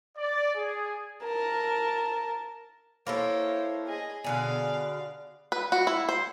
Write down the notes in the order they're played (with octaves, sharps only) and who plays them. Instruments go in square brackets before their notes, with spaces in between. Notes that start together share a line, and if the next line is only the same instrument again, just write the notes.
[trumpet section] D5
G#4
[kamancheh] A#4 A5
[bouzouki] A#3 E4 A4 [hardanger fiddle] C5 C#5
[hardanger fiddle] G#4 D#5
[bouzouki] B2 D3 G#4 [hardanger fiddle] D5 F5
[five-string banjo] B4
F#4
E4
C5